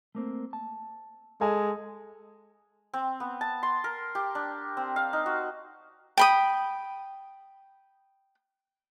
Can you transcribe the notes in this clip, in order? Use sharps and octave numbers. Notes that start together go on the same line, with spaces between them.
A3 A#3 C4
A5
G#3 A4 G#5
C4
B3
A5
C6
A#4
G4
D4
C4
F5
D#4
F#4
G5 B5 D#6